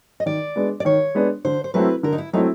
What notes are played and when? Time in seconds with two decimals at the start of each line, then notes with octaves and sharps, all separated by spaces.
0.20 D#5
0.26 D#3 D5
0.56 G#3 B3 D4
0.80 D5
0.85 D#3 C#5
1.15 G#3 B3 D4
1.45 D3 C5
1.64 C5
1.74 F#3 A3 C4 E4 B4
2.03 D3 A#4
2.12 D#4
2.18 E4
2.33 F#3 A3 C4 D#4 E4